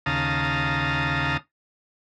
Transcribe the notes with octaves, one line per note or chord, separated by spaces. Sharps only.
D#2 C#3 F5 A5 A#5 D#6